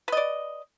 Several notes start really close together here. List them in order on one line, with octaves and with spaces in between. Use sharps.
B4 D#5 D5